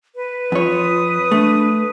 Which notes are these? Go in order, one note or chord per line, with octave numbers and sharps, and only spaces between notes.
B4
F2 F4 C#5 D#6
A3 D4